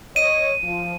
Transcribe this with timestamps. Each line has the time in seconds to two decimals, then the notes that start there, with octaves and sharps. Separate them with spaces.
0.16 C#5 D#5 D#7
0.63 F3